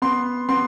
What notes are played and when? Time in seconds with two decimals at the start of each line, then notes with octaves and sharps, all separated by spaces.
0.02 B3 C6
0.49 B3 C6